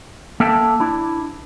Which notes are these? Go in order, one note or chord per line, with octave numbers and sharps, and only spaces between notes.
A#3 A4 E5 G5 A5
D4 E4